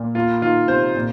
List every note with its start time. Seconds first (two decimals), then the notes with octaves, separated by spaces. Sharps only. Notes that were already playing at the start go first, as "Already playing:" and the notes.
Already playing: A#2
0.15 A#3 F4
0.42 D#3 F4
0.68 C3 C5
0.95 A#2